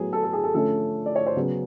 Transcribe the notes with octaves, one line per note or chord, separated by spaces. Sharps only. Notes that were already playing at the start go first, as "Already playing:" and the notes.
Already playing: A2 F#3 B3 G#4
A4
A4
G#4
A4
D3 F3 A3 C#4 A4
D5
C#5
C5
C#3 F#3 B3